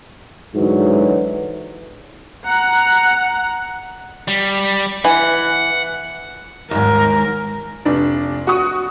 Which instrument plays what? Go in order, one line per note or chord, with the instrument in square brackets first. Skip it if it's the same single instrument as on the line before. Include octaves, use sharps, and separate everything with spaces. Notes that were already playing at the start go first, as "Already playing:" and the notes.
[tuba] G#2 [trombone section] D3 E3 F#3
[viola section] F#5 A#5
[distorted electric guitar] G3
[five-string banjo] E3 [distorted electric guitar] F#5
[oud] D#2 G#2 [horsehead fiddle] A#4
[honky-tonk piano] F1 D4
F#4 C#6 D#6